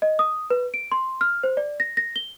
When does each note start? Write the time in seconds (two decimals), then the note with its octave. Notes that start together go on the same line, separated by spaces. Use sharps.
0.02 D#5
0.19 D#6
0.50 B4
0.74 D7
0.92 C6
1.21 F6
1.43 C5
1.57 D5
1.80 A#6
1.97 A#6
2.16 G7